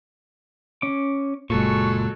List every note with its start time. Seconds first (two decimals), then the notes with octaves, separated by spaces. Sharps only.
0.82 C#4 D6
1.50 F#1 A#2 F#3 G#3 A4 C#6